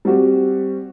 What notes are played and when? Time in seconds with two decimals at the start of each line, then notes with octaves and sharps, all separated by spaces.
0.05 G3 C4 F#4 G4